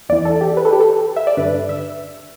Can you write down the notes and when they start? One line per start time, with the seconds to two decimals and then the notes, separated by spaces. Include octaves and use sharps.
0.09 E2 E3 D5
0.25 A4
0.41 G4
0.57 B4
0.65 A4
0.73 G4
0.81 A4
1.16 E5
1.27 D5
1.37 G2 D3 B4
1.69 E5